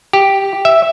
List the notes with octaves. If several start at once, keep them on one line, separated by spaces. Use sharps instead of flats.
G4
E5